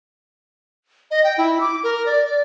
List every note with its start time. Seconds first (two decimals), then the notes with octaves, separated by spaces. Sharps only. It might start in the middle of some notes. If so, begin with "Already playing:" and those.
1.11 D#5
1.24 G5
1.38 E4
1.61 D6
1.84 A#4
2.06 D5
2.25 D5